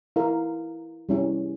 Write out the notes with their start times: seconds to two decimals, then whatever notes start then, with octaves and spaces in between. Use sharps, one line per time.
0.16 E4 A#4 F5
1.09 G3 C#4 E4